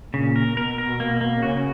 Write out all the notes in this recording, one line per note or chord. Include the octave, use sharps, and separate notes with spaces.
A#2 C#3
A#4
B2 A#4
A#4
A#3
A#3
C#3 F#4